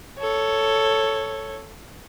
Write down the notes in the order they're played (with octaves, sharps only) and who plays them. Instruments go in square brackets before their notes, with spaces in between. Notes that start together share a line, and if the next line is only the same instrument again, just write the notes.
[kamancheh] A4 C#5